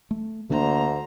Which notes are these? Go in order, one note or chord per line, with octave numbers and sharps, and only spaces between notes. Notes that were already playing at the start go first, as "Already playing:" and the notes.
A3
D2 D3 A#3 D4 C5 A#5